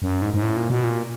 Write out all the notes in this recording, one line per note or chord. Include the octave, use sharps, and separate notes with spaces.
F#2
G#2
G#2
A2
A#2
B2
A#2